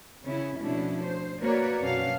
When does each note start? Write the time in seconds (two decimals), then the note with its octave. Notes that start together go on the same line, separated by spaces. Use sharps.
0.24 C#3 C#4 E4
0.58 B2 F3 A3 C#4 D4 E4
1.03 C5
1.40 A#3 F#4 A#4 B4 C#5 D5
1.81 F#2 B2 C#4 D4 F#4 F5